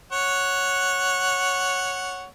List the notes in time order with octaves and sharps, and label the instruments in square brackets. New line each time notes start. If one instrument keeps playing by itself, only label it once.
[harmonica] C#5 F#5